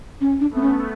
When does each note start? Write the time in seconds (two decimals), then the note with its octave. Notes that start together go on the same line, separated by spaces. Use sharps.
0.21 C#4
0.40 D4
0.50 A3 B3 C4
0.61 C#4